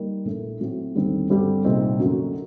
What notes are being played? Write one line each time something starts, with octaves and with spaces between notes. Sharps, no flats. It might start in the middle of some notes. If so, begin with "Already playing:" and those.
Already playing: G3 A#3 D#4
A#1 A2 A3
A2 F#3 C4
D#2 D3 G3 C4
G2 D3 G3 C4 G4
C2 A#2 G3 C4 D#4
F#2 D3 F#3 A#3 F#4